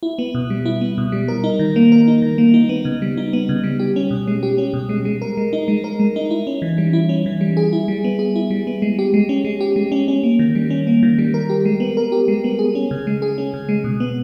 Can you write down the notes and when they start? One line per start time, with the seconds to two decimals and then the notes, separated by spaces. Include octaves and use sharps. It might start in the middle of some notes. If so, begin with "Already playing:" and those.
0.03 E4
0.19 B3
0.35 B2
0.50 G3
0.65 E4
0.81 B3
0.98 B2
1.12 G3
1.28 A#4
1.44 D#4
1.59 D#3
1.76 A#3
1.92 A#4
2.08 D#4
2.22 D#3
2.38 A#3
2.54 D#4
2.69 B3
2.85 C#3
3.02 G3
3.17 D#4
3.33 B3
3.49 C#3
3.64 G3
3.79 G4
3.96 C#4
4.11 B2
4.27 G#3
4.43 G4
4.58 C#4
4.73 B2
4.89 G#3
5.05 G#3
5.22 A#4
5.37 G#3
5.53 D#4
5.68 G#3
5.84 A#4
6.00 G#3
6.16 D#4
6.30 E4
6.47 C#4
6.62 E3
6.78 G3
6.93 E4
7.09 C#4
7.26 E3
7.41 G3
7.57 G#4
7.73 E4
7.88 G3
8.04 B3
8.19 G#4
8.36 E4
8.51 G3
8.67 B3
8.82 G#3
8.99 G4
9.14 G#3
9.29 C#4
9.45 G#3
9.61 G4
9.76 G#3
9.92 C#4
10.08 C#4
10.23 A#3
10.39 D#3
10.55 G3
10.70 C#4
10.87 A#3
11.03 D#3
11.18 G3
11.34 A#4
11.50 G4
11.65 G#3
11.80 B3
11.97 A#4
12.12 G4
12.28 G#3
12.44 B3
12.59 G#4
12.75 C#4
12.91 C#3
13.07 G#3
13.22 G#4
13.38 C#4
13.54 C#3
13.69 G#3
13.84 B2
14.00 B3